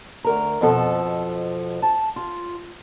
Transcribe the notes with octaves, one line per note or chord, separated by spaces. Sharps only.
D2 A#4 A#5
F2 B2 F3 A4
A5
F4